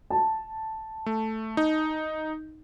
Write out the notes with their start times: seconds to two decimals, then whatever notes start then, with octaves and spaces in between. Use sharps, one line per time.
0.10 A5
1.06 A3
1.57 D#4